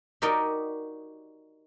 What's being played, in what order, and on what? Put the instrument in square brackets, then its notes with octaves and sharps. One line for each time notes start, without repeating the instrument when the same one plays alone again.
[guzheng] D#4 F#4 G4 A#4 D5 D#5